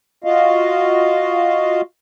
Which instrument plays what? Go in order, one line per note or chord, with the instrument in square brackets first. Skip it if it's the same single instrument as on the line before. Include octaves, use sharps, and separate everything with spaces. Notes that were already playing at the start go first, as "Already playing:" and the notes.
[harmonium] F4 F#4 D#5 F5